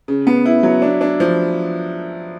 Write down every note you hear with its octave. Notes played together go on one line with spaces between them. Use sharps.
C#3
B3
E4
F#3
D4
D4
F3